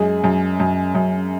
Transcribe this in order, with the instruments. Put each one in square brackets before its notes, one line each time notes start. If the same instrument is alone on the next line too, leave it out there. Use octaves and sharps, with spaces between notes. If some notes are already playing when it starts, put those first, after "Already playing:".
Already playing: [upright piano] F#2 G#3 G#4
F#2
F#2
F#2